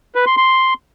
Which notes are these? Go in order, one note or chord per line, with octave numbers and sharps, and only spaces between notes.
B4
C6
C6